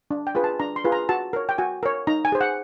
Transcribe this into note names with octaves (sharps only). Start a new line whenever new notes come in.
D4
G5
F4 G#4 B4
A5
D4 A#5
C6
F4 G#4 B4
A#5
F#4 A5
A#4 C#5
G5
F#4 G#5
A#4 C#5
D#4 A#5
G#5
G#4 C5
F#5